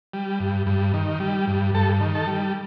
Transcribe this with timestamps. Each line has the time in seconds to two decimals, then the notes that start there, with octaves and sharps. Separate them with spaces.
0.13 G3
0.40 G2
0.67 G2
0.94 D#3
1.20 G3
1.47 G2
1.75 G2 A4
2.01 D#3
2.15 A4
2.27 G3